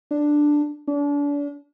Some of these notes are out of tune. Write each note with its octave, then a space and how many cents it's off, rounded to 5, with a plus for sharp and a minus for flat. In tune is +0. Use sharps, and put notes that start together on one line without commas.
D4 +5
D4 -35